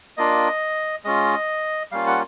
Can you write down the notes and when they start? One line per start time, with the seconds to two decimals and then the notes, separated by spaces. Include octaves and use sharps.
0.17 A#3 D4 F4 D#5
1.05 G#3 C#4 F4 D#5
1.92 G3 A#3 C#4 F4 F5
2.07 F#5